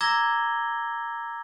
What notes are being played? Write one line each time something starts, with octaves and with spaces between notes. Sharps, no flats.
A#5 D6 E6 G#6 A#6 G7